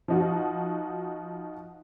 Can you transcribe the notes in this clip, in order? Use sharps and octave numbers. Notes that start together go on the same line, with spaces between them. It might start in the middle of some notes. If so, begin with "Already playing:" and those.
F3 D#4 F#4